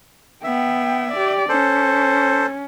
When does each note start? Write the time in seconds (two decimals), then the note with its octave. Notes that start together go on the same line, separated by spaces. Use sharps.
0.44 B3 E5 G5
1.12 G4 D5
1.49 C#4 A4 C5